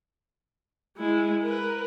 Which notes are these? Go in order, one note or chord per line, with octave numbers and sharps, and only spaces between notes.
G#3 E4
A#4 B4